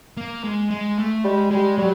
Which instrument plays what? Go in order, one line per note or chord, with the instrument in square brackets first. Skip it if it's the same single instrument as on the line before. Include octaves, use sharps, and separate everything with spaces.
[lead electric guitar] A#3
G#3
G#3
A3
[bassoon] G3 [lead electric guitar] G#3
[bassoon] G3 [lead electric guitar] G#3
[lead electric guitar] F#3 [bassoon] G3